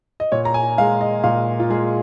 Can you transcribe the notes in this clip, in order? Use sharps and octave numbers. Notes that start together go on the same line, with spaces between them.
D#5
A#2 C#5
A#5
G#5
G#3 F5
D#5
A#2 F5
F4
G#3 G#4